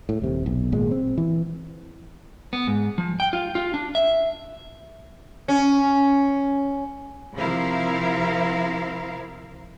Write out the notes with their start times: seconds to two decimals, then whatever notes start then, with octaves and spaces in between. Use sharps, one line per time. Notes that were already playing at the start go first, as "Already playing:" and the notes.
0.09 A2
0.22 D#1 C3
0.46 B1
0.72 G#1 A#2 G#3
0.91 C4
1.18 E3
2.53 B3
2.67 G#2
2.98 F3
3.20 G5
3.33 F4
3.55 F4
3.74 D4
3.95 E5
5.48 C#4
7.35 C3 F3 E4 A#4 F5